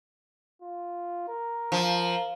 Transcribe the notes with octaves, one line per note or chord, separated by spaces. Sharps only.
F4
A#4
F3